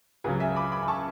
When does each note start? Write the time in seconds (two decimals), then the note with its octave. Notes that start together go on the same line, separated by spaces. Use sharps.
0.24 C#2 C#3 F#3 G#4 B4
0.40 E5 G#5
0.56 B5 D6
0.72 B5 D6
0.83 B5
0.88 A5 C#6